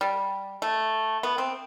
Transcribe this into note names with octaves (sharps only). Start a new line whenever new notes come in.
G3
A3
B3
C4